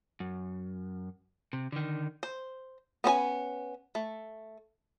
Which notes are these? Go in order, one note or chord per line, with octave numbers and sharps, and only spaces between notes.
F#2
C3
D3 D#3
C5
B3 C#4 C5 G#5
A3